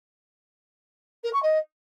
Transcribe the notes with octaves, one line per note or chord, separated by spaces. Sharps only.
A#4
C#6
D#5